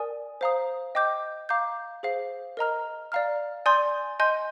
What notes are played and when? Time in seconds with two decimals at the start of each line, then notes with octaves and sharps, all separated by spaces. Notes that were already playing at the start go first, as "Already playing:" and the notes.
Already playing: A#4 D5 G#5 D#6
0.41 C5 F5 A#5 D#6
0.95 D#5 G5 D6 G6
1.49 F5 A#5 D6 G6
2.03 G#4 C5 F5
2.57 A#4 D#5 A#5 F6
3.12 D5 F5 A#5 F6
3.66 D5 G#5 C6 D#6 G6
4.20 D#5 G#5 C6 G6